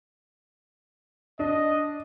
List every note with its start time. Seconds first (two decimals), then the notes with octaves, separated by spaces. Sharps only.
1.39 D4 D#5